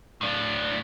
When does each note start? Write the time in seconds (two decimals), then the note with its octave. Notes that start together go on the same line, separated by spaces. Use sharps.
0.21 A2 D4